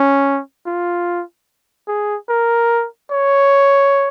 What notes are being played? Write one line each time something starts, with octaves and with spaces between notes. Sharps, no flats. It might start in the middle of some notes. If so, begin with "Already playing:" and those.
Already playing: C#4
F4
G#4
A#4
C#5